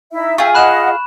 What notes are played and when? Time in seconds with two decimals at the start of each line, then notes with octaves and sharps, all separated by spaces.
0.12 D#4 E4 E5
0.38 F4 G#4 E5 G5 C#6
0.55 D#5 F#5 B5 F#6 E7